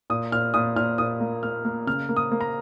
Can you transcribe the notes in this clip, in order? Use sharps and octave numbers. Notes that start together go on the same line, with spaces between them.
A#2 D#6
A#2 F6
A#2 D#6
A#2 F6
A#2 D#6
A#3
A#3 F6
A#3
C#3 F6
A#3
D#6
A#3
A#5